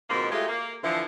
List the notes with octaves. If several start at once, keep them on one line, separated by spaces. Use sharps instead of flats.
F2 G#2 B2 D#3 G#3 A#3
F#3 G#3 A3 F4 G4
A#3
D3 E3 F3